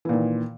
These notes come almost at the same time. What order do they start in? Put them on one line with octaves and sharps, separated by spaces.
E3 A#2 D#3